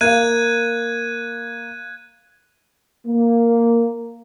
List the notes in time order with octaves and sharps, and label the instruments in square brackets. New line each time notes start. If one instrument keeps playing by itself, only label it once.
[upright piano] A#3 F5 [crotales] F#6 G#6 D#7
[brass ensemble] A#3